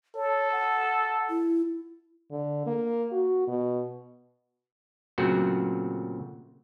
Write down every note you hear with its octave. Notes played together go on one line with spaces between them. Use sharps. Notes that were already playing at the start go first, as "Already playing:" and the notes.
A4 C#5
F#5
E4
D3
A#3
F#4
B2
A#2 C#3 F#3 A3 C4 F#4